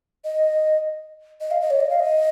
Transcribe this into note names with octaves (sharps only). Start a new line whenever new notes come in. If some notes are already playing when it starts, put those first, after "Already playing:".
D#5
D#5
F5
D#5
C#5
D#5
F5
D#5